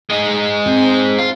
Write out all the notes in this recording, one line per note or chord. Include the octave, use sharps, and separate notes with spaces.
G#3 D#4
C4 C5 A5
F4